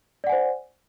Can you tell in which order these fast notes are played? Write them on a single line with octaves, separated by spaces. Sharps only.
D5 F#5 G#5 C5